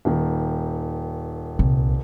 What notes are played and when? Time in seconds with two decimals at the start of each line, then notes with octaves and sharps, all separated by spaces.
0.05 D#1 D#3
1.59 C2 A#2